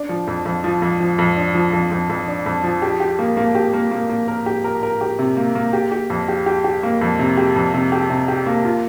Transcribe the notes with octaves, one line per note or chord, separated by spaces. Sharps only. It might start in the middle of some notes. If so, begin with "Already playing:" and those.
Already playing: D4
F3
F2
F2
F3
F2
F3
F2
D4
F3
F2
F2
F2
D4
F2
F3
G4
G4
A#3
A#3
G4
A#3
A#3
A#3
A#4
G4
A#4
A#4
G4
C3
A#3
A#3
G4
G4
F2
G4
G4
G4
A#3
F2
C3
G4
F2
C3
G4
C3
G4
A#3
F4